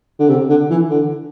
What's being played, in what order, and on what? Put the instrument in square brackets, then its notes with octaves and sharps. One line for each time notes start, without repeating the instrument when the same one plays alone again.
[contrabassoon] D3
C3
D3
E3
D3